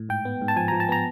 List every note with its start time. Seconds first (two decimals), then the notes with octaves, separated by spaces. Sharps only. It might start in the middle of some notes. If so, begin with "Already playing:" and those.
Already playing: A2
0.09 G#2 G5
0.25 B3
0.42 G#2
0.48 A5
0.56 F3 G#5
0.68 A#5
0.72 F3
0.80 A5
0.89 B3 A#5